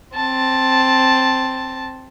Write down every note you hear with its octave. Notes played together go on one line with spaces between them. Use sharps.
C4 A5